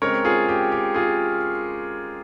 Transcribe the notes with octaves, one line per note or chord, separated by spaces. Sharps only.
C#3 G#3 C4 A#4 C#5
F4 G#4
G4
G4
F4 G#4